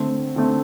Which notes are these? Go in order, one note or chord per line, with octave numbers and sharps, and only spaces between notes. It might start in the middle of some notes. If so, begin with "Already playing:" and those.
Already playing: D3 A3 C4
D3 A3 C4